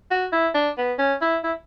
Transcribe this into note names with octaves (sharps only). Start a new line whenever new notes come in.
F#4
E4
D4
B3
C#4
E4
E4